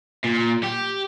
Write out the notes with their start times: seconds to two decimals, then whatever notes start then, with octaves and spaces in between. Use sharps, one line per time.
0.25 A#2
0.64 G4